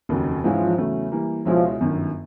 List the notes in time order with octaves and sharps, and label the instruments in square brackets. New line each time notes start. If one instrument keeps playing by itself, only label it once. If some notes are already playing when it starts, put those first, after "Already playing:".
[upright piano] F1 D#2 C#3 F#3
[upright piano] G#2 E3 G#3 C#4 E4 [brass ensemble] F3
[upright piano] E2 C#3 F#3 A3 C#4
E3 G3 A#3
[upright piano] C#2 B2 G#3 C#4 E4 [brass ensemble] F3
[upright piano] G1 F#2 D#3